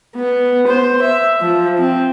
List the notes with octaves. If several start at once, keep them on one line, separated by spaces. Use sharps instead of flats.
B3
C5
E5
F3
C4